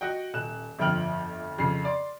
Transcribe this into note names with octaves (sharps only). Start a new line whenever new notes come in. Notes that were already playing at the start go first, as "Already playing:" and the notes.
F#4 D#5 F#5 G5
D#1 F#6 E7
G1 F2 F3 G5 F6 F#7
F2 C#3 C7
D5 C6